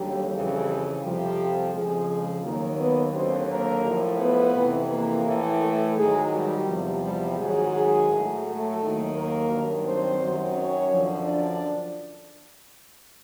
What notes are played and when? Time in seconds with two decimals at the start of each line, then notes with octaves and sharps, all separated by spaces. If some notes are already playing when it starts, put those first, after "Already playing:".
Already playing: D#2 D3 F#3 G3 G4
0.31 F2 C#3 E3
1.01 F2 C3 F3 G3 G4
1.72 F2 C#3 F3 G#3 G#4
2.42 D#2 D#3 F#3 A#3 A#4
2.77 B3 B4
3.13 D#2 D3 F#3 C4 C5
3.48 A#3 A#4
3.83 A2 F3
4.18 B3 B4
4.54 F2 C3 E3
4.89 A#3 A#4
5.24 A2 E3
5.59 A3 A4
5.95 G#2 D#3 F#3 G#3 G#4
6.30 G3 G4
6.66 E2 C3 F3
7.01 G3 G4
7.36 G#2 D#3 F#3 G#3 G#4
7.71 G#3 G#4
8.07 A2 F#3
8.42 A3 A4
8.77 D#2 D#3 F#3
9.12 A#3 A#4
9.48 G2 D#3 F#3
9.83 C4 C5
10.19 F#2 D#3 F#3
10.53 C#4 C#5
10.89 F#2 D3 F3
11.24 D4 D5